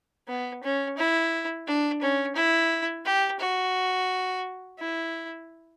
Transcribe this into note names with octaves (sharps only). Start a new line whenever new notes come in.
B3
C#4
E4
D4
C#4
E4
G4
F#4
E4